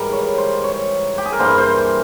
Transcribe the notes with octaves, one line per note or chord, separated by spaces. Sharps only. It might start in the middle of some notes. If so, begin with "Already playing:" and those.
Already playing: G#2 E3 G3 A#4
C#5
C5
C#5
G4
G#4
A#4
G2 E3 G3 A#3 C5
C5